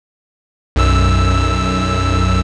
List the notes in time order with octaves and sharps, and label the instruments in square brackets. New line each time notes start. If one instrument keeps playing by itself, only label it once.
[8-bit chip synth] B1 F#2 E6